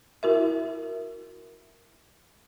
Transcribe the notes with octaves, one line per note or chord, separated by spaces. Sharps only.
E4 F#4 A#4 E5